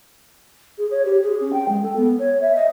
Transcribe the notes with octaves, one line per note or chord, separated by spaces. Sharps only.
G#4
C#5
G4
G#4
C#4
G5
G#3
A4
B3
C#5
E5
D#5